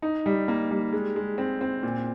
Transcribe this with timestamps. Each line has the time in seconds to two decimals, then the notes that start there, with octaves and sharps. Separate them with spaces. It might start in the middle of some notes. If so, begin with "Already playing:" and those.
0.02 D#4
0.26 G3
0.48 A#3
0.71 G3
0.93 G#3
1.16 G#3
1.38 C4
1.61 C4
1.83 A#2